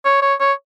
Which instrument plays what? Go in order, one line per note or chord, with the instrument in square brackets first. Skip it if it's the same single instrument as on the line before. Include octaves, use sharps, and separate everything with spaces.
[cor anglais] C#5
C#5
C#5